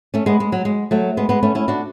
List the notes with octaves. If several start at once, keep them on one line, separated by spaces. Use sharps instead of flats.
A3 C#4
G#3 B3
G#3
F#3
G#3
F#3 A3
G#3 B3
G#3 B3
A3 C#4
C#4 E4
D4 F#4